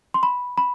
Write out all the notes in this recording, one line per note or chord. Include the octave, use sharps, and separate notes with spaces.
C6
B5
B5